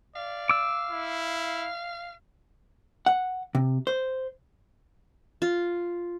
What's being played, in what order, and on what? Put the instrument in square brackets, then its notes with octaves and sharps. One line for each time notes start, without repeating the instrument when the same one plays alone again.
[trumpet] D5 [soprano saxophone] F5
[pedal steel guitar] D6 E6
[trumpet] E4
[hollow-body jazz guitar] F#5
C3
C5
[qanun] F4